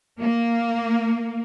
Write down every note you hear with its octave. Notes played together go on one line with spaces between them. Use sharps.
A#3